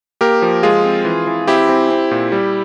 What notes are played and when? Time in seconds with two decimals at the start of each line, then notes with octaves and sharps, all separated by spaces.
0.21 A#3 G4 A#4
0.42 F3
0.63 G#3 F4 G#4
0.85 C4
1.05 E3
1.27 E3
1.47 C4 E4 G4
1.69 C4
1.91 C4
2.11 A#2
2.32 G3